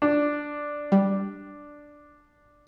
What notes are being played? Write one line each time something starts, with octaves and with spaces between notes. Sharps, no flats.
D4
G3